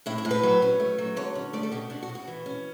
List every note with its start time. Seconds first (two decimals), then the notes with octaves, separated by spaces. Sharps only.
0.06 A2 E4
0.18 E4
0.25 A2
0.31 B4
0.43 F#3
0.62 C#4
0.80 A3
0.98 F#3
1.17 D3 C#5
1.35 C#4
1.53 A3 D5
1.63 A4
1.72 B2 G4
1.90 B2 D4
2.03 F#4
2.09 B2
2.15 F#4
2.28 E3
2.46 C#4